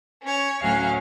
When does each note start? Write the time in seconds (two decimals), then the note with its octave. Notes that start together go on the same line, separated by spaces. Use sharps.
0.22 C#4 C#5
0.62 D2 A2 F#3 C#4 F5